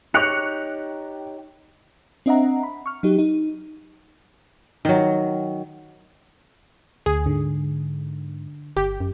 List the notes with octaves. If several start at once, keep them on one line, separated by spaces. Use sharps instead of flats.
D#4 G4 C#5 F#6 C#7 F7
C4 D4 D#5 E5 F#5 A#5
B5
C#6 F6
F#3 D#4 G4
D#4
D#3 F#3
D2 G#4
G#2 D3
G1 G4 G6
F#2